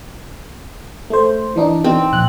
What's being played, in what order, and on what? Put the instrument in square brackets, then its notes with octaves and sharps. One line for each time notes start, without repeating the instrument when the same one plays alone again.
[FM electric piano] A3 C5
E3 D4 D#4
[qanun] C4
[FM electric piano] A#1 F#6